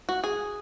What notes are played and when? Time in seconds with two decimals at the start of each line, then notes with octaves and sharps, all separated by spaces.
0.09 F#4
0.24 G#4